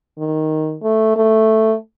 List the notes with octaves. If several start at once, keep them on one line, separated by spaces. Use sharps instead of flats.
D#3
A3
A3